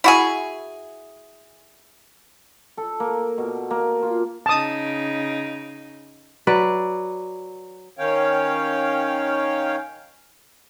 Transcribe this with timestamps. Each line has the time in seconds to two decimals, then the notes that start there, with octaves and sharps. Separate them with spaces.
0.04 E4 F#4 G#4
2.77 A4
3.00 A#3
3.38 B2
3.71 A#3
4.02 F4
4.46 C#3 D#4 A5 D#6
6.47 F#3 B4 D5
7.99 D#3 C#4 C#5 F5 G5